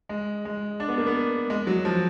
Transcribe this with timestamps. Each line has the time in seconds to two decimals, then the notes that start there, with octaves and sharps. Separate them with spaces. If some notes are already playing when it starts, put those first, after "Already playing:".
0.09 G#3
0.45 G#3
0.80 D4
0.89 B3
0.98 A#3
1.07 B3
1.50 G#3
1.67 F#3
1.85 F3